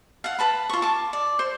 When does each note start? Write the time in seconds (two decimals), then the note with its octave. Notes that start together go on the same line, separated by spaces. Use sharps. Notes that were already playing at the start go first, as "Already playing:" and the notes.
0.24 F5 F#5
0.39 B4 A5 B5
0.69 F4 C#6
0.82 A5 D6
1.13 D5
1.39 C5